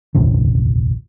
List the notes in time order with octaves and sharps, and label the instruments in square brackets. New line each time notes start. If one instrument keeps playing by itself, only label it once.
[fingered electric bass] F1 A#1 D#2 D3